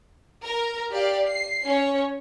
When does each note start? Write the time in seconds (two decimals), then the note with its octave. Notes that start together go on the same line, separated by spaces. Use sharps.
0.45 A#4
0.92 G4 D5 F5
1.28 C7
1.66 C#4 C#5